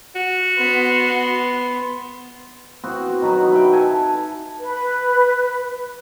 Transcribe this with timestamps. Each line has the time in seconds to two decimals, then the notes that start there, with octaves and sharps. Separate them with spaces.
0.15 F#4
0.58 B3 C6
2.84 B3 C4 F#4
3.21 B2 D#3 F#3 B5
3.52 E5 G5 A#5 B5
3.73 A4 G#5
4.60 B4